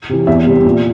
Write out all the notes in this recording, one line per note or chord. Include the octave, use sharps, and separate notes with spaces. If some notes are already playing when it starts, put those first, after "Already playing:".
C3 E3
E2 E5
C3 G3
A#2